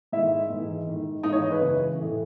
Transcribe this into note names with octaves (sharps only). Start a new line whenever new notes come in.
G#2 D#3 E4 E5
G#2 E3
G#2 D#3
G#2 E3 D#4 D#5
C#5
D#4 D#5
B4
F#2 C#3 E3
A2 E3